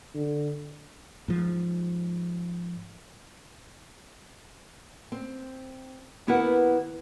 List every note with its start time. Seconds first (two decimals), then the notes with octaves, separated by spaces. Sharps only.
0.15 D3
1.28 G#2 F3
5.12 C4
6.27 D#2 B3 E4 A#4 B4 F#5